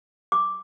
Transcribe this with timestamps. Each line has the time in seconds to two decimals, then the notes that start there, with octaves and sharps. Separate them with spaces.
0.32 D6